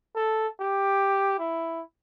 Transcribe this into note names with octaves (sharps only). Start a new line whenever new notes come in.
A4
G4
E4